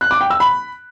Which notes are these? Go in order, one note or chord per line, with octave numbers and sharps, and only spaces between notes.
F#6
D6
G5
E6
B5